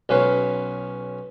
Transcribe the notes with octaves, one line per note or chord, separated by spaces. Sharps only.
B1 C#4 B4 F5